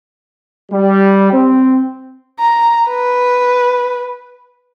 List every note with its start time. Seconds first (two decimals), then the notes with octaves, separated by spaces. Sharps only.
0.71 G3
1.33 C4
2.40 A#5
2.88 B4